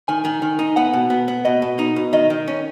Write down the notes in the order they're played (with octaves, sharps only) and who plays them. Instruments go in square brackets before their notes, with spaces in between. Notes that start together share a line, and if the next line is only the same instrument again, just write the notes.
[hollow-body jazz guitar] D#3 [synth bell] G#5
[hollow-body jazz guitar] D#3
D#3
D#4
[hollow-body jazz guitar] B3 [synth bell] F#5
[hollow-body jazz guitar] B2
B3
B3
[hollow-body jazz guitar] B2 [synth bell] D#5
[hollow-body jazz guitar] B2
D#4
B2
[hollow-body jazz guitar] D#3 [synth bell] D#5
[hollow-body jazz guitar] D#3
C#4